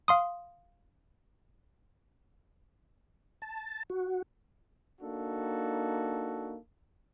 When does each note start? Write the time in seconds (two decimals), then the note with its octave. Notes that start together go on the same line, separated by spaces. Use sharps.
0.08 F5 C6 D#6
3.42 A5
3.90 F#4
5.01 A#3 D4 D#4 F#4 A4